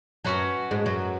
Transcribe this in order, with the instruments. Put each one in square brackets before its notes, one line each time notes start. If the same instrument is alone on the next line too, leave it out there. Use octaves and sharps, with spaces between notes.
[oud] F#2 F#3 [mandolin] C#4 F#4 B4
[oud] G#2 G#3
F#2 F#3